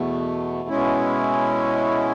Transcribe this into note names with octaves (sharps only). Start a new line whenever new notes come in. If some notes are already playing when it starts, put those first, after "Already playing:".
Already playing: E2 B2 A3
B2 G#3 C#4 E4